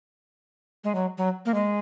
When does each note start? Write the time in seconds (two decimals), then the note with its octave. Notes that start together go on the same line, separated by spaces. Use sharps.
0.84 G#3
0.95 F#3
1.18 F#3
1.46 A#3
1.54 G#3